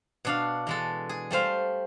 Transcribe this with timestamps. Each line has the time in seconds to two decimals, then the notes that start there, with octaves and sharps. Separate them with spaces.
0.25 B2 D4 F5
0.67 E3 G#3 A4
1.09 G#4
1.31 G3 A3 C5 F5